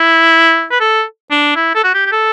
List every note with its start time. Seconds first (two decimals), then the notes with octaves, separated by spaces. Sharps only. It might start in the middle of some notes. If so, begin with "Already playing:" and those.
Already playing: E4
0.71 B4
0.80 A4
1.31 D4
1.56 E4
1.75 A4
1.84 F#4
1.94 G4
2.06 G4
2.12 A4